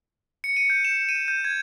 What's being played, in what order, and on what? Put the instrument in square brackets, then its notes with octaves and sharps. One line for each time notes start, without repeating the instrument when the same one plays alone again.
[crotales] C#7
D#7
G6
E7
D#7
G6
G#6